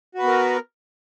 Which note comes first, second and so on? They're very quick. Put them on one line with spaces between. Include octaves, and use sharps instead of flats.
F#4 B4 B3 A#4